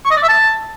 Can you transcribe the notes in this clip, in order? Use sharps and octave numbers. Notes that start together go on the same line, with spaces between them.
C#6
D#5
D5
E5
A5